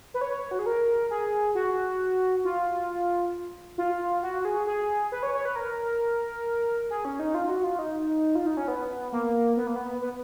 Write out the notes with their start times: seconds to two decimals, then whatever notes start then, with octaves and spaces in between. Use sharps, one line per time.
0.14 B4
0.21 C#5
0.51 F#4
0.59 G#4
0.66 A#4
1.11 G#4
1.55 F#4
2.45 F4
3.78 F4
4.23 F#4
4.45 G#4
4.67 G#4
5.12 B4
5.23 C#5
5.34 C#5
5.45 B4
5.56 A#4
6.90 G#4
7.05 C#4
7.19 D#4
7.35 F4
7.49 F#4
7.64 F4
7.79 D#4
8.35 F4
8.46 D#4
8.57 C#4
8.68 B3
9.12 A#3
9.57 B3
9.67 A#3
9.76 B3
10.01 B3